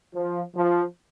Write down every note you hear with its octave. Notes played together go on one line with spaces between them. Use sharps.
F3
F3